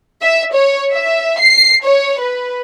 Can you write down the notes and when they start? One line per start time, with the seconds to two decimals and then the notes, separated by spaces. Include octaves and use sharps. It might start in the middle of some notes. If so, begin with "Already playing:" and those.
0.22 E5
0.54 C#5
0.91 E5
1.39 C7
1.84 C#5
2.19 B4